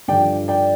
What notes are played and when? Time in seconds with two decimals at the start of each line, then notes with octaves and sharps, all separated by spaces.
0.08 G2 D3 F3 D5 G5
0.48 D5 G5